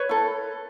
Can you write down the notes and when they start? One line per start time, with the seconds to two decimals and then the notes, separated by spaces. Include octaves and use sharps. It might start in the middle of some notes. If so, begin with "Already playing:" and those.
Already playing: B4 C#5
0.09 E4 A4